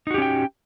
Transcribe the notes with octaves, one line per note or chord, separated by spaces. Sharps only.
C#4 D#4 F#4 G4 G5